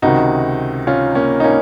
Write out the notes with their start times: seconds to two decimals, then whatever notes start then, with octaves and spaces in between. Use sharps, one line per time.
0.02 C#2 C3 D#3 D#4 F#4
0.87 C#4 F4
1.15 A#3 C#4
1.40 D#4
1.44 A#3 C#4